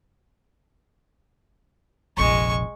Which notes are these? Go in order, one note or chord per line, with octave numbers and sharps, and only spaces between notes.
F1 A#1 G#3 C#6